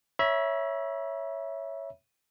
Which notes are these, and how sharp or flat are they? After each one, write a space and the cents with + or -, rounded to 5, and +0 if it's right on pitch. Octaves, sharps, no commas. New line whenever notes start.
C#5 +0 E5 +0 B5 -45